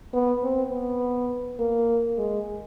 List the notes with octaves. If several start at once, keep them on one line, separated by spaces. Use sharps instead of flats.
B3
C4
B3
A#3
G#3